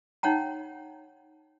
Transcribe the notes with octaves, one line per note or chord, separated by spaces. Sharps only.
D#4 C#5 F#5 G5 A#5